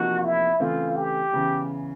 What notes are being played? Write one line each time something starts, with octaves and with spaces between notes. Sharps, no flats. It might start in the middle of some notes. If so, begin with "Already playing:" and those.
Already playing: E2 C3 F3 A#3 D#4 F#4
E4
C#3 E3 A3 C4 F4
G4
E2 C#3 E3